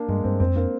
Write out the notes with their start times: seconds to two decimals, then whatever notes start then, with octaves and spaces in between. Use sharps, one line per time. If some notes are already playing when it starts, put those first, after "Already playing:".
Already playing: A#3 D4
0.09 G2 G#3
0.24 G2 C4
0.40 F2 C4
0.56 A#3 D4